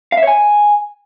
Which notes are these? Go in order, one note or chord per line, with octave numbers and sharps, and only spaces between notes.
F5
E5
C#5
G#5